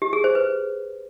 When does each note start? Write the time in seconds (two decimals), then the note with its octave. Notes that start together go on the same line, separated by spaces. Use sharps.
0.02 G4
0.13 G#4
0.24 C5
0.35 B4